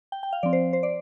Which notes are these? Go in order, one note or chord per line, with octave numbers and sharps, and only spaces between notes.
G5
G5
F5
F3 C4 D5
C5
C5
D5